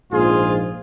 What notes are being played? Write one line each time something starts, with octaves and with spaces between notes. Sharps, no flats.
A#1 G#2 F3 F4 G#4